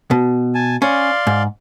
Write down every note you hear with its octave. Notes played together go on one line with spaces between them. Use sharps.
B2
G#5 A5
C#4 D5 F5 C6
G#2